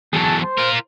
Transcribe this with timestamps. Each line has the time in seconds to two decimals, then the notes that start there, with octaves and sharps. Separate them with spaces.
0.13 E2 F#3 G#4 A4 A5
0.41 C5
0.58 F4 A#4